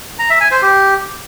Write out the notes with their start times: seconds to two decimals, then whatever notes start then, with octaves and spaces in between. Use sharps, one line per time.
0.19 A#5
0.30 E5
0.41 G#5
0.51 C5
0.62 G4